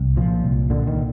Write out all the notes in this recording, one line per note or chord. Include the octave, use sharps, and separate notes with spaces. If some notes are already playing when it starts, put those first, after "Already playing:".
Already playing: C2
A#2 F3
C2
A#2 D3
D#3